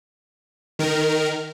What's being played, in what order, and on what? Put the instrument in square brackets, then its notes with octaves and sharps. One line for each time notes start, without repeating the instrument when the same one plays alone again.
[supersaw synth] D#3 A#4